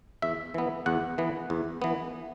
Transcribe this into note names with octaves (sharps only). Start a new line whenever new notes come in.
E2 E5
E3 B3
E2 F#5
E3 B3
E2
E3 B3